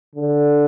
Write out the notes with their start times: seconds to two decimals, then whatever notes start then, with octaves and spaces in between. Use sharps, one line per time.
0.15 D3